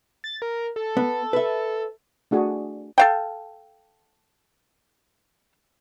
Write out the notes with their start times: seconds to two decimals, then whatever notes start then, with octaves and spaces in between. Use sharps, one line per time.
0.24 A6
0.42 A#4
0.76 A4
0.97 B3
1.33 B4 E5
2.31 A3 D4 F#4 G#4 G#5
2.98 A4 F5 G5